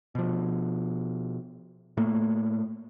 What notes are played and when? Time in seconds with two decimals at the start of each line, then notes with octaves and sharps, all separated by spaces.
0.15 B2 F3
1.97 A2 A3 A#3